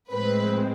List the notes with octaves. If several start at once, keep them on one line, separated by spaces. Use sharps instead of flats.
A2 F3 G#3 C4 B4